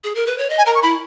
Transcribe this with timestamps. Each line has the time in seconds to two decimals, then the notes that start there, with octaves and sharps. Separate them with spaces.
0.04 G#4
0.15 A#4
0.27 B4
0.38 C#5
0.50 D#5
0.58 G#5
0.66 A#4 A#5
0.75 C#6
0.82 E4 B5